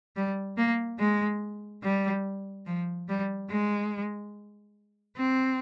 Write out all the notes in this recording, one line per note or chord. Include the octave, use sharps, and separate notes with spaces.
G3
A#3
G#3
G3
F3
G3
G#3
C4